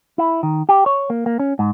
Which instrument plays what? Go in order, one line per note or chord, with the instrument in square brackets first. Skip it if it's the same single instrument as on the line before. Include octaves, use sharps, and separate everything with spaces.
[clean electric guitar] E4
D#3
G4
C#5
A#3
A#3
C#4
G#2